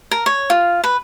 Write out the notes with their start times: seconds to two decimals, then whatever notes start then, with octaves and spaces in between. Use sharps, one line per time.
0.11 A#4
0.26 C#5
0.50 F4
0.84 B4